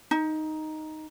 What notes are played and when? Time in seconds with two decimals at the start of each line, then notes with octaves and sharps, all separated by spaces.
0.11 D#4